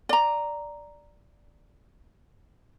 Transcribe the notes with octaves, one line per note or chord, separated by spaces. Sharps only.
D5 A#5